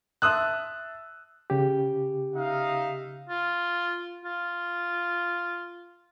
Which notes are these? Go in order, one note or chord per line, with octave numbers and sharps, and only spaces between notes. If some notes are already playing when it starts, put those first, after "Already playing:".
E5 A5 C6 D#6 E6 F#6
C#3 G4
D#4 E5 F5
F4
F4